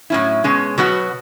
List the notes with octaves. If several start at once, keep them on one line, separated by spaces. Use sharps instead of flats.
A2 F#3 C#4 E4
B2 G#3 C#4
B2 F#3 B3 F#4